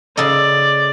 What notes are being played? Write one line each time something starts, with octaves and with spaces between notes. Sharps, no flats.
C#3 A4 D5 D#5